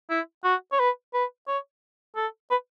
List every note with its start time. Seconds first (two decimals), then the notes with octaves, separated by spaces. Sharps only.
0.10 E4
0.44 F#4
0.72 C#5
0.79 B4
1.14 B4
1.47 C#5
2.16 A4
2.51 B4